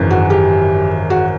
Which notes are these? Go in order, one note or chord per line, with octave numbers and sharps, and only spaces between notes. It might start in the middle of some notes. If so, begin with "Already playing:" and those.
Already playing: G#1 F#2 C#3 E3
F#4
G4
F#4